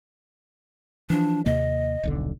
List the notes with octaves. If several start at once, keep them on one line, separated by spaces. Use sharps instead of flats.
E3 F3 D4
D#2 C3 A#3 D#5
D#1 B1 D3